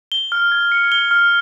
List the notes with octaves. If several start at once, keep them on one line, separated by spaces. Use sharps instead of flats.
G7
F6
G#6
C#7
G7
F6